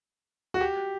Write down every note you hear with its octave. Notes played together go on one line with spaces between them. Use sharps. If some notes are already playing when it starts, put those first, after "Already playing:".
F#4
G4